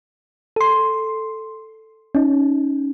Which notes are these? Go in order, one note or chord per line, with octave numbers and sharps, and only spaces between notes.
A4 C6
C#4 D#4